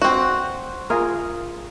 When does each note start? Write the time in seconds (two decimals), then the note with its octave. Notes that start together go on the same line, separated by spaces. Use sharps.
0.02 C4 F#4
0.90 F4 G#4 A#4